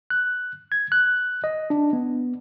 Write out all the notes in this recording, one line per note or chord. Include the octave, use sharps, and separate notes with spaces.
F#6
G#6
F#6
D#5
D4
B3